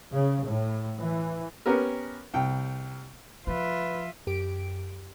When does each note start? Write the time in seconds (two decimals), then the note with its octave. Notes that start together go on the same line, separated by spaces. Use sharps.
0.14 C#3
0.46 A2
0.97 E3
1.66 B3 C#4 G4 A#4
2.34 C2 G5
3.47 F3 F4 B4 E5
4.27 F#2 G4 D7